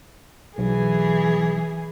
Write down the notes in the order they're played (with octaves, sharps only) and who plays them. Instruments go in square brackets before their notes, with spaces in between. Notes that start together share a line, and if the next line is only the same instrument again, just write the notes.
[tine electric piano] B1 [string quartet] E3 G#4